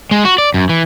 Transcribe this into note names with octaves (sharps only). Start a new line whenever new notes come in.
G#3
F#4
D5
F#2
E3